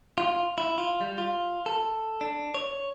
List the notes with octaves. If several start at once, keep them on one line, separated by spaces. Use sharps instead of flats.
F4
E4
F4
G3
F4
A4
D4
C#5